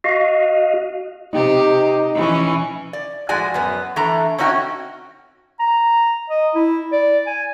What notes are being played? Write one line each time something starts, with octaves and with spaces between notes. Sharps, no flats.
F#4 D#5 F5
C3 D#4 G4
E3 C#4
D5
A2 F3 G#3 F#4 D5 G#5
F#2 B3
E3 A3 D4 A#5
C4 C#4 D#4 F#4 C#5 G5
A#5
D#5
E4
D5
G#5